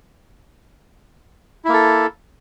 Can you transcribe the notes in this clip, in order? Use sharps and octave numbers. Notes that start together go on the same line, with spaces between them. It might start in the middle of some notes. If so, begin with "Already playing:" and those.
A#3 E4 A4